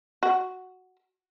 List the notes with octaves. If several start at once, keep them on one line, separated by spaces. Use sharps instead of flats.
F#4